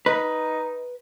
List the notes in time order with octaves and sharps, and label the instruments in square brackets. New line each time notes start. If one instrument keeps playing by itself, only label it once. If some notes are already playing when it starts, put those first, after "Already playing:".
[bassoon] D#4 [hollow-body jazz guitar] B4